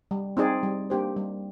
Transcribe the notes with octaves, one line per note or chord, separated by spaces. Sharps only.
G3
C4 D#4 G#4 D5
G3
A#3 D4 G4 C5
G3